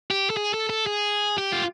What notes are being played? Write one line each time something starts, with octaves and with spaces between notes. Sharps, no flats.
G4
A4
G#4
A4
A4
G#4
G4
F4